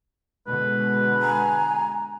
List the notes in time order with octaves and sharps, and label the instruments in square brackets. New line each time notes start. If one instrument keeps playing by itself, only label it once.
[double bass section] B2 D3 G#3 [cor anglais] B4
[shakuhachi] G#5 [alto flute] A#5